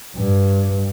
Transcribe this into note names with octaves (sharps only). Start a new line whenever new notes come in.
G2